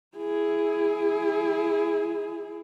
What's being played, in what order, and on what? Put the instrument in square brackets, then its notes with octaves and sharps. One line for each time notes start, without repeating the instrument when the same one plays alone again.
[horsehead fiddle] E4 G#4